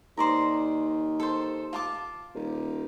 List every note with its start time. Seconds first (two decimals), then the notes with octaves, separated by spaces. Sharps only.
0.17 D#2 C5 D5 A#5
1.20 A4 C5
1.73 F4 A5 D6
2.35 D#1